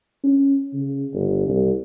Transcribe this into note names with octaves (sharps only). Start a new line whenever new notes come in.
C#4
C#3
G1
C2